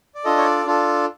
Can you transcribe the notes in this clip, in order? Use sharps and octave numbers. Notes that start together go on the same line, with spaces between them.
D5
D4 F4 A4 D#5
C#5
D5
D4 F4 A4